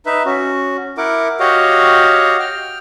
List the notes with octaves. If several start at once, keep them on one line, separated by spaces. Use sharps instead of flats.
D#4 B4 E5
C#4 F#4
E4 A#4 F#5 D6
F#4 G4 C#5 D#5 F5 F#5
G5 F6